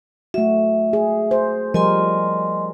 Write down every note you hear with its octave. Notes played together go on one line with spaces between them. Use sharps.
A3 F#4 E5
G#4
C5
F3 G3 A#4 D#5 G#5 C6